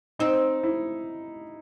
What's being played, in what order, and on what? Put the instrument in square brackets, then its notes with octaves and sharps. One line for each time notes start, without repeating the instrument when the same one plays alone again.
[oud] C4 [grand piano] D#4
[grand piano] E4